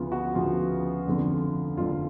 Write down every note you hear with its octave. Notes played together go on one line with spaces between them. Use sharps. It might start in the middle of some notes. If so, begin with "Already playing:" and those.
Already playing: D2 C#3 F3 B3 F4
F#4
D2 C#3 F3 F4
F1 F2 D3
F1 F2 D3 F4